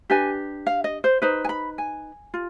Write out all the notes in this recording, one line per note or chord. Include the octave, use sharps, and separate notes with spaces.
D4 G4 B4 G#5
F5
D#5
C5
D#4 B4 C5
G#5
B5
G#5
F4